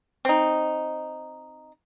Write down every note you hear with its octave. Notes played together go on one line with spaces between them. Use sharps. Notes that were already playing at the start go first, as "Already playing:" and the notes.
C4 D#4